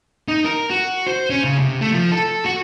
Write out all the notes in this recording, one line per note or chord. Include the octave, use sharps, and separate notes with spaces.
D#4
A#4
F#4
C5
C#4
C#3
C3
A3
F3
A4
F#4